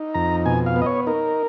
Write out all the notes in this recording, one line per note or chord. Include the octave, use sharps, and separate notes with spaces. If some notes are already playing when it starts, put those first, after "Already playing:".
Already playing: D#4
F2 A#5
B2 G#5
F5
B3
D#5
C#5
D#4 A#4